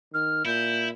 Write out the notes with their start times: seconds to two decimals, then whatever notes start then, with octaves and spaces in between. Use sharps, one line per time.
0.13 D#3 F6
0.45 A#2 E4 G6